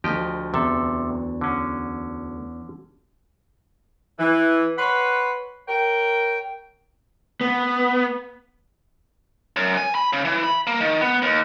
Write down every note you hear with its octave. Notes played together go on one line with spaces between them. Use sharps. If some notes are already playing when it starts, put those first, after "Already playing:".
D2 F3 G4 D#5
E2 C3 A4
D3 C#4
E3
B4 C#5 F#5 B5 C6
A#4 C#5 G5
B3
F#2
G#5
B5
C#3
E3
B5
A#3
D#3
B3
D#2